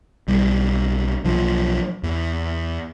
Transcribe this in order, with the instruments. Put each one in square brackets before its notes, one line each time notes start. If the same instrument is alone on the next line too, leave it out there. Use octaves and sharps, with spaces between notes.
[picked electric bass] B1 G3
B1 F3 F#3
E2